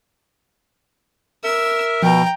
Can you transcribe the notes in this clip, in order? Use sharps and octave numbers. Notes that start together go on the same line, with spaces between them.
A#4 E5 E6
B2 F3 G5 A#5